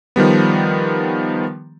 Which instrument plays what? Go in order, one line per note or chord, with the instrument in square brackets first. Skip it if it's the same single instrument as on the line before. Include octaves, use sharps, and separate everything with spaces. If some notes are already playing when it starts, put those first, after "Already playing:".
[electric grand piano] D#3 F3 G3 B3